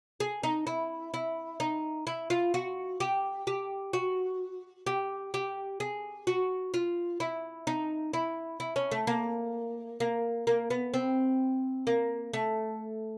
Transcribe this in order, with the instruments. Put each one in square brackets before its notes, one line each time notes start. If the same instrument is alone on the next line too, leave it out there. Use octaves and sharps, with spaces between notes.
[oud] G#4
D#4
E4
E4
D#4
E4
F4
F#4
G4
G4
F#4
G4
G4
G#4
F#4
F4
E4
D#4
E4
E4
C#4
A3
A#3
A#3
A#3
B3
C4
A#3
A3